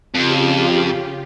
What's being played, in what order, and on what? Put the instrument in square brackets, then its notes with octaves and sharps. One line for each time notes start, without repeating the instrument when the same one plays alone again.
[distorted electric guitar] F2 [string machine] C#3 F4 G4